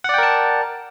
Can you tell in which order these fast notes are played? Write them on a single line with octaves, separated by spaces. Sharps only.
F#5 D5 G5 A#4 A5